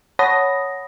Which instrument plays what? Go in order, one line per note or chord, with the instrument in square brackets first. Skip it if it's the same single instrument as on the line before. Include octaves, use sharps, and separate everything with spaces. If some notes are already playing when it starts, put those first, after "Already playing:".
[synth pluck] C#5 F#5 A5 B5 D#6 A#6